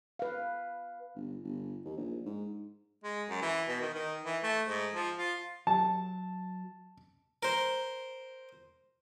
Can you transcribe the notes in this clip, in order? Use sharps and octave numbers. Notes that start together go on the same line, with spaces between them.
B4 F5
G1
G1
D#2
A#1
G#2
G#3
F#2
E3
B2
D#3
D#3
E3
A3
G#2
F3
F4
F#3 A5
A#4 C5